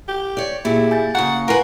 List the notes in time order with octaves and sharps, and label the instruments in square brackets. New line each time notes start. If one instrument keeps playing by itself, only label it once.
[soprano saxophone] G4
[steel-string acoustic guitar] C#5 D5
[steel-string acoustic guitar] A#2 [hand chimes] A#3 G4 G#4 [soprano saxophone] E4
[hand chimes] G#5 G6 A6
[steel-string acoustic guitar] C#3 A#3 [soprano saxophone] F#5 [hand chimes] A#5 C#6
[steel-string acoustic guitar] F4 B4 [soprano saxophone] A#4 [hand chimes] F#5 G#5